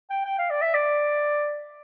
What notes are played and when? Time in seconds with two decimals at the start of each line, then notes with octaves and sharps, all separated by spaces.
0.10 G5
0.25 G5
0.38 F5
0.50 D5
0.62 E5
0.74 D5